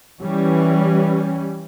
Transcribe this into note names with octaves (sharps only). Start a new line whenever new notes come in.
E3 G3 C#4